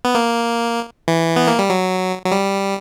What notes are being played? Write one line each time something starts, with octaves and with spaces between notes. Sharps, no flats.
B3
A#3
E3
B3
A#3
G3
F#3
F#3
G3